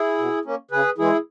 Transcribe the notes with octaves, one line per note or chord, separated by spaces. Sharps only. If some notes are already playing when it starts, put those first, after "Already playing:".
Already playing: E4 G#4
B2
A#3 C#4
C#3 G#4 B4
E3 G#3 E4 G#4